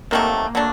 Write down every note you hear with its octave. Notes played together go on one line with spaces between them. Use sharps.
C3 D#3 F#3 A3 A#3
F#3 A3 D4